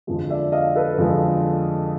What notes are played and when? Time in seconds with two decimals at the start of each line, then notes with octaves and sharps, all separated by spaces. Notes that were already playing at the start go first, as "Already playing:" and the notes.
0.07 F2 D3 F3 G#3
0.30 D5 E5
0.52 D#5 F5
0.75 A4 B4
0.98 F2 D3 F3 G#3